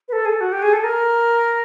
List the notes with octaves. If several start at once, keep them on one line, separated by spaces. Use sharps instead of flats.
B4
A4
G#4
A4
F#4
G4
G#4
A4
A#4